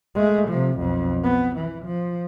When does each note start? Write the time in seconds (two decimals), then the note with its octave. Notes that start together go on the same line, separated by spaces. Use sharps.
0.15 G#3 A3
0.48 C3 F3
0.78 B1 F2
1.23 B3
1.56 E3
1.85 F3